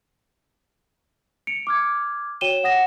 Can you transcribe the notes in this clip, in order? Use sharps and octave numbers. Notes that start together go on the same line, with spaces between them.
C#7 D7 F7
D6 F6 G#6
F#4 C#5 G5 D#7 E7 G7
F#5 D#6 A#6 E7